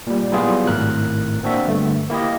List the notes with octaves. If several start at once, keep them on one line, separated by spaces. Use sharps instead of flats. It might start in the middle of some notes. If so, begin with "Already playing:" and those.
A#2 G3
F#3 G3 B3 E4 F4 G#4
G#1 A2 A#4 F#6
A#3 C4 D4 F#4 E5
G1 G2 A3
A#3 E4 G4 D#5